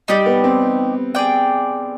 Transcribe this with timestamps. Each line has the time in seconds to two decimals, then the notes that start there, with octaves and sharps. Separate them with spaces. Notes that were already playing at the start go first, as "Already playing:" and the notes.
0.08 G3 D#4 G4 D5
0.26 B3
0.44 C4
1.15 G#4 D5 G5